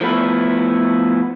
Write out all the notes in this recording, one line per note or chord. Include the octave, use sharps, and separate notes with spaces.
F3 A3 B3 E4